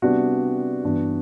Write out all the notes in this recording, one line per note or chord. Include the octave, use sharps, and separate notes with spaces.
C3 G3 B3 D4 F#4
G2 E3 B3 D4